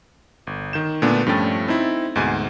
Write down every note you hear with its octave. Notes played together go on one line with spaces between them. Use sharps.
G1
D#3 G6 E7
A#2 D3 A3 B3 D4
G2 F3 A3 C#4 G5 A6
C4 D#4 E4
D2 G#2 B2 G#5